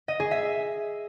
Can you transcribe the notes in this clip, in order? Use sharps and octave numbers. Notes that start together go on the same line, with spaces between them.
D#5
G#4
E5